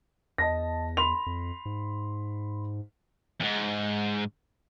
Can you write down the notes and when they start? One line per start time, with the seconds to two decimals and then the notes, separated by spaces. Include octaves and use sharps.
0.38 E2 D#5 A5 A#6
0.97 B5 C6 F7
1.26 F2
1.65 G#2
3.40 E2 G#2